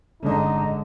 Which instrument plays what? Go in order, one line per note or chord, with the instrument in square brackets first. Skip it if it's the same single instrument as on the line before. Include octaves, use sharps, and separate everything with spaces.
[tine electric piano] G1 G#3 G#4 [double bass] D3 [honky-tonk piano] C#4 A4 D#5 [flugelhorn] D#4